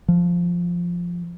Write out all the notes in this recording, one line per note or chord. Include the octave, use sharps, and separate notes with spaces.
F3